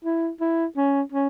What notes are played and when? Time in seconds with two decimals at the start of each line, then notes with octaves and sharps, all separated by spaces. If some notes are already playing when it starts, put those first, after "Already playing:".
0.05 E4
0.41 E4
0.77 C#4
1.12 C#4